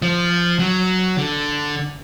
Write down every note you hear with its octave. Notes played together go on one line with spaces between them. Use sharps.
F3
F#3
D3